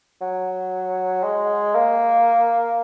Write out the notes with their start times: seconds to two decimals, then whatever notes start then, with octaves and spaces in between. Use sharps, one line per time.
0.21 F#3
1.23 G#3
1.75 A#3